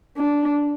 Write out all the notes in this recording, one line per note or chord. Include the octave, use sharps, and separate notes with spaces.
D4